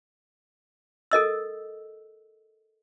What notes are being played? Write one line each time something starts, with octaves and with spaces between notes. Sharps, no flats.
A4 A#4 D#5 E6